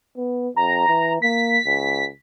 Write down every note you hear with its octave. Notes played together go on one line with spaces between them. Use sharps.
B3
F2 A#5
E3
A#3 B6
C#2